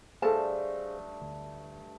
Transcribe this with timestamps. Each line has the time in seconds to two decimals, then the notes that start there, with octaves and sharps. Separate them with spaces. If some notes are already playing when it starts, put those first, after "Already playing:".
0.22 G2 A3 G#4 A4 C5 F5 A5
1.22 D2